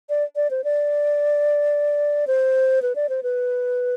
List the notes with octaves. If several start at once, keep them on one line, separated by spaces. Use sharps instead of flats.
D5
D5
C5
D5
C5
B4
D5
C5
B4